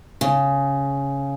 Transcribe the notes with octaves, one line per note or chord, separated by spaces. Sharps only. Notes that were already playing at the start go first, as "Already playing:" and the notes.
C#3